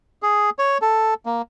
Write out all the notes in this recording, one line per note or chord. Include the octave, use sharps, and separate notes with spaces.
G#4
C#5
A4
A#3